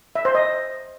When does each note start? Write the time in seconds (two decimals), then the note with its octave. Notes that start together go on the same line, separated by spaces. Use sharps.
0.15 E5
0.25 C5
0.35 D#5